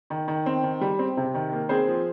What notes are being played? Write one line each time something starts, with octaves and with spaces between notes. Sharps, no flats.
D#3
D#3
C4
D#3
G3
C4
C3
D#3
A#3
C4 G#4 C5
F3